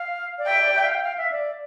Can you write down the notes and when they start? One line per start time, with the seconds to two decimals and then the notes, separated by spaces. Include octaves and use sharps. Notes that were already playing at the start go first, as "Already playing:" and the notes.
Already playing: F5
0.38 D5
0.47 E5 G5
0.61 D5
0.75 E5
0.85 F5
0.95 G5
1.03 F5
1.18 E5
1.32 D5